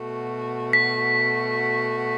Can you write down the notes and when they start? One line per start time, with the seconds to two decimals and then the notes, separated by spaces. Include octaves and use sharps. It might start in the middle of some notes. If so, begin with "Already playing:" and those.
Already playing: B2 A3 F#4
0.73 B6